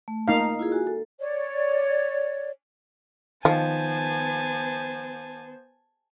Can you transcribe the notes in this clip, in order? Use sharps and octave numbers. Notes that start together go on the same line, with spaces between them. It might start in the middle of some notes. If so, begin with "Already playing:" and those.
A3
A#3 D#4 F5
E4 F4 G#4
F#4 G#5
A4
C#5 D5
D#3 F3 B3 C5 G#5 A5